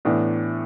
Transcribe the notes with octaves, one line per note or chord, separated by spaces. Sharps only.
A2 E3 B3 D4